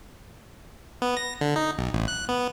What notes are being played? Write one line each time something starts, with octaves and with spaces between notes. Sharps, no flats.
B3
A#6
D3
D#4
B1
A1
F#6
B3